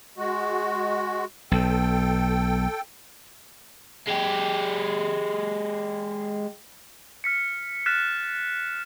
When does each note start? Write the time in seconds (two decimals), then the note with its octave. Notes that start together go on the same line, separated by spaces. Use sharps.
0.18 G#3 F#4
1.51 B1 A4 G5
4.07 G#3 G4
7.24 F6 B6 C#7
7.86 F6 F#6 A6 B6 C#7 E7